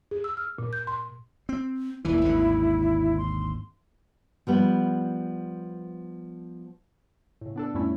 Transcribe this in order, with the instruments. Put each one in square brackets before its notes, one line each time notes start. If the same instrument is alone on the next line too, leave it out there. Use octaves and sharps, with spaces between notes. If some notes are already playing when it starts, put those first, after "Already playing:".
[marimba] G#4
E6
F6
A#2
G6
C6
[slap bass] C4
[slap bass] D#1 D#2 E3 [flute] E4
[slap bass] G#1 D#2 D3
[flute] C6
[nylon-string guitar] F3 G3 B3
[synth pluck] A2 C#3
B3 D4 A4
F2 A2 G3 A3 C#4 E4